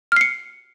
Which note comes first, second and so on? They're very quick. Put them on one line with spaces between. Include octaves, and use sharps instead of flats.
F6 C7 C#7